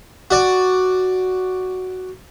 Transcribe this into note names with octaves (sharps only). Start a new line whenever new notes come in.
F#4 D5